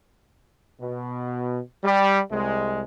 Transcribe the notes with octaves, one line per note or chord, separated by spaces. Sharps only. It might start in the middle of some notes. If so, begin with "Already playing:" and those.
B2
G3
C2 G#3